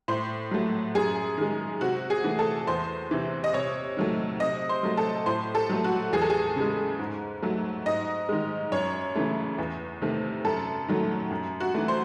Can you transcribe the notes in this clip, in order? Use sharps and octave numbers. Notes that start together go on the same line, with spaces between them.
A2 C5
F#3 A3
F#2 G#4
D#3 G#3
C3 F#4
G#4
E3 A3
A4
E2 C5
C3 E3
D#5
C3 C#5
D#3 F#3 A3
C3 D#5
C5
F#3 A3
A4
A2 C5
A4
F#3 A3
F#4
E2 G#4
A4
G#4
C#3 G#3
G#2
F#3 A3
G#2 D#5
D#3 G#3
F#2 C#5
C#3 E3 A3
E2
C3 D#3 A3
F#2 A4
D#3 F#3 A3
F#2
F#4
E3 A3
C5